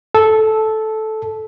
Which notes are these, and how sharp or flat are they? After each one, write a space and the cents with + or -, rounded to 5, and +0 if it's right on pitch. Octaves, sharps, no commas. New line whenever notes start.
A4 -10